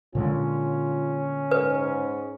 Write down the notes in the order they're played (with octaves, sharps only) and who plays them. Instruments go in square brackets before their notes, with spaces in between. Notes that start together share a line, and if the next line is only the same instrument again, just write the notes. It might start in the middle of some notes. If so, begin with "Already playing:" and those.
[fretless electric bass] A#2 D3 G#3 [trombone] C#4 [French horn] F4
[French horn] G#2 [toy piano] B4